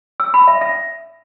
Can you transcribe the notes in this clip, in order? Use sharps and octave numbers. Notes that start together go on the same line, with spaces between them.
E6
B5
E5
E5